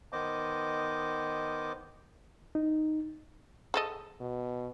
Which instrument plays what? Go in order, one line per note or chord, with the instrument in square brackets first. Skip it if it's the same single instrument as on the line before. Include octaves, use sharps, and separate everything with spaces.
[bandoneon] D#3 B3 C5 D#5 D6
[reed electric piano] D#4
[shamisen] G#4 A4 D#5
[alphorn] B2